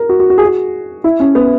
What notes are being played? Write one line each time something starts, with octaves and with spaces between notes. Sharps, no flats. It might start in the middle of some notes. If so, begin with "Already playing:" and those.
Already playing: A#4
F#4
F#4
F#4
G#4
F#4
E4
C#4
B3